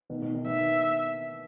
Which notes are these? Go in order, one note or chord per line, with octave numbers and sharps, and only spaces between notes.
B2 D#3
B2 D#3
B2 D#3
B2 D#3 E5